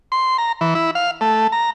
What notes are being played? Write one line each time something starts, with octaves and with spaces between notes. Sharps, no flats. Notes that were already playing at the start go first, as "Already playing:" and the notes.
C6
A#5
E3
E4
F5
A3
A#5